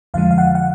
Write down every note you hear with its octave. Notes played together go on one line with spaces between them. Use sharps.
F2 D3 F3 G#3 F5
F5
F#5
F#5